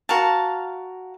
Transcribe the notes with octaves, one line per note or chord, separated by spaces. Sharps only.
F#4 A#4 F5 A5